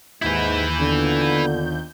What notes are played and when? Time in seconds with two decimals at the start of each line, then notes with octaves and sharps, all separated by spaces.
0.22 D#2 G#2 E4 B4 G6
0.80 D3 B3 D4 F4